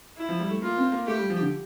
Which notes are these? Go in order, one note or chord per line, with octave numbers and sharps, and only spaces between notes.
E4
F3
G3
A3
A#3 F4
C4
A#3
A3 G4
G3
F3
D3